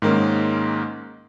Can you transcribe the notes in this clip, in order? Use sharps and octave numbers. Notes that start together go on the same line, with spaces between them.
G#2 D#3 G#3 A#3 C#4